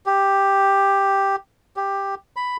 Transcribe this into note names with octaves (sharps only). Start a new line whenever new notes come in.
G4
G4
B5